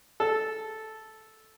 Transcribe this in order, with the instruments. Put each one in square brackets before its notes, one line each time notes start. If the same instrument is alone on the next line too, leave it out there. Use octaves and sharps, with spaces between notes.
[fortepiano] A4